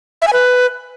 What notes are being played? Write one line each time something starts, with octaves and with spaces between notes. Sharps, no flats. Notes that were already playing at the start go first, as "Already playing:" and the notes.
E5
G#5
B4